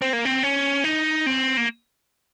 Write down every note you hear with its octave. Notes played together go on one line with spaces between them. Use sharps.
C4
A#3
C4
C#4
D#4
C4
A#3